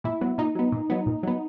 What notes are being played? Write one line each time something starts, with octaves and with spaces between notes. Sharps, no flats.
A#2 E4
F#3 B3
A#2 D#4
F#3 B3
A#2
F#3 B3
A#2
F#3 B3